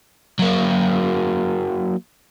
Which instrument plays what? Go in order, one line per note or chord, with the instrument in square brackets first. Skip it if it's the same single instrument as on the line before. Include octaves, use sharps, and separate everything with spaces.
[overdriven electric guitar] F#3 A#3